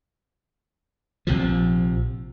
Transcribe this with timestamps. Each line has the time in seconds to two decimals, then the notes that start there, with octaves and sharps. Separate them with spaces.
1.27 A#1 C3 F3